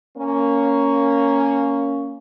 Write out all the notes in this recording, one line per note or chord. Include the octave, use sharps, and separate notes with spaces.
A#3 C#4